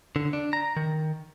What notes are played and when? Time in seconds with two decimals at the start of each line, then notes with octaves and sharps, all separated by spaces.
0.16 D3
0.33 D4
0.53 A#5
0.76 D#3